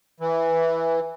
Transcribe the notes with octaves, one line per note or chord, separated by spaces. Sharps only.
E3